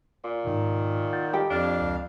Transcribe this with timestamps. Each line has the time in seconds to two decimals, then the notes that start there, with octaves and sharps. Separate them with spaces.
0.24 A#2
0.45 G#2 B2 D#3
1.13 F#5 G6 A6
1.33 G4 A4 D#5 G5 B5
1.50 F2 D4 F5
1.80 C#2 D5